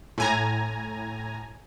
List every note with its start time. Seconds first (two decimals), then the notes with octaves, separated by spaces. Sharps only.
0.18 A2 G#5 A#5